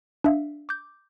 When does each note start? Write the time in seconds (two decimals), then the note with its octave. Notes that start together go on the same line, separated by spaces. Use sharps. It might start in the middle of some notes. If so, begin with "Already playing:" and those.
0.24 D4 E5 F5
0.69 D6 G6